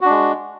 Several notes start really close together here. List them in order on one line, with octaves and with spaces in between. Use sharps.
F#4 D4 G#3